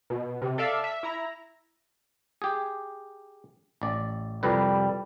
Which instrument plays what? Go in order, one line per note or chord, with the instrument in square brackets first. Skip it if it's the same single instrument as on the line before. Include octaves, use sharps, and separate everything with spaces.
[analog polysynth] B2
C3
A4 D5 E5 F5
E5
E4 A#5
[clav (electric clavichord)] G4 G#4
A1 D5
[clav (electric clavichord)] C2 F2 B4 [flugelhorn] G3